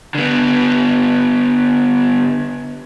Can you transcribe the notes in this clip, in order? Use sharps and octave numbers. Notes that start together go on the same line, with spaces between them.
D3 B3